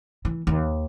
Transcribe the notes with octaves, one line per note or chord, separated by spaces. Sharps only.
E3
D#2